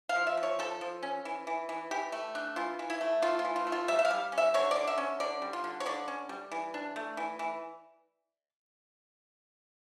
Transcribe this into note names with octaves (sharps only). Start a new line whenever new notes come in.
F5
F3
E5
F3
C#5
F3 A4
F3
C#4
E3
E3
E3
E3 G4
A3
D4
E3 F4
E3
E4
A3
A3 F4
F4
E3
F4
A3
F4
G3 E5
E5
F5
G3
C#4
E5
D3 C#5
D3 D5
E5
C#4
D3 D5
G3
F4
D3
C#5
D3 D5
C#4
G3
E3
D4
A3
E3
E3